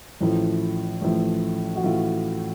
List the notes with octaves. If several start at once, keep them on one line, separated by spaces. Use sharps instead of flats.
A1 A2 F3 A3 E4
A1 A2 F3 A3
F#4
A1 A2 F3 A3 F4